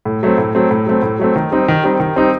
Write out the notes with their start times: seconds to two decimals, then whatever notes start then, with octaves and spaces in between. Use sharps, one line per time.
0.05 A2
0.23 F#3 A3 C4
0.38 A2
0.55 F#3 A3 C4
0.71 A2
0.86 F#3 A3 C4
1.02 A2
1.19 F#3 A3 C4
1.36 D#3
1.52 G3 C4 D#4
1.68 D#3
1.84 G3 C4 D#4
2.00 D#3
2.16 G3 C4 D#4